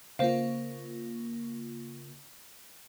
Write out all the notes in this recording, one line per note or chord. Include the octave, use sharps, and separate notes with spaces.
C#3 A#3 F4 C5 F5